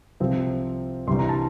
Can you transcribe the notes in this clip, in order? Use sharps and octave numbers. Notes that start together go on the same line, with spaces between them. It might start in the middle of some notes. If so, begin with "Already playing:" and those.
C2 C3 F3 C4
C2 C3 E3 G3 D4 C6
A#5
A5